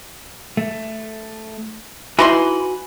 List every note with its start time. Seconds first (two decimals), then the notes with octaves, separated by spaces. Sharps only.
0.57 A3
2.19 E3 D#4 F#4 G#5 B5 C6